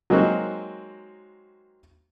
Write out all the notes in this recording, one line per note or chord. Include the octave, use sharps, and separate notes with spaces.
F#3 G#3 A#3 C4 D#4 F#4